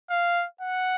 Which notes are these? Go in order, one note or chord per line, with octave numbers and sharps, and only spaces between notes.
F5
F#5